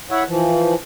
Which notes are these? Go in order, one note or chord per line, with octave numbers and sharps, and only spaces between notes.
E4 C#5 E5 F#5
E3 F3